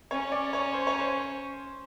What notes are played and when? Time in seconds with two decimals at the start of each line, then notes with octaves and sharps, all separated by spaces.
0.11 C#4 C#5
0.32 D5
0.53 C#5
0.73 C5
0.87 C#5
0.99 C5